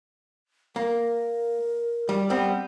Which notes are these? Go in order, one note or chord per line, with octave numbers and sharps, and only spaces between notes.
A#3 A#4
G3
G3 B3 C4